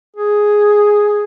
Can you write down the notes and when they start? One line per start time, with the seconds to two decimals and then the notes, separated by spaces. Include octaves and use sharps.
0.16 G#4